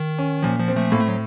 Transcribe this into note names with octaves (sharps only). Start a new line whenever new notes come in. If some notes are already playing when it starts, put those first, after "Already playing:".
Already playing: D#3
C#4
A#2 F3
F3
C4
F3 A3
A2 A#3
A3
F#3